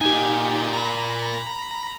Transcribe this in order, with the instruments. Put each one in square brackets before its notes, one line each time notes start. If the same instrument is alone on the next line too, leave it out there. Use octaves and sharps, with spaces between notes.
[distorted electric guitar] A#2 G#5 [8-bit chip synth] D#4 G4
[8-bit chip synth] A#5 B5